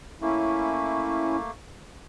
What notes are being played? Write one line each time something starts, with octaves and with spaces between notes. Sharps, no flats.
A3 A#3 C#4 E4